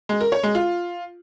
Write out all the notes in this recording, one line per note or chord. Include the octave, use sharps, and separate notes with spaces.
G#3
A#4
C#5
G#3
F4